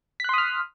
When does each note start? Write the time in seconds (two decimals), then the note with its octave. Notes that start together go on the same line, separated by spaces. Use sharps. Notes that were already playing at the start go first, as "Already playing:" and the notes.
0.20 B6
0.24 F#6
0.29 C6
0.34 D#6
0.38 F6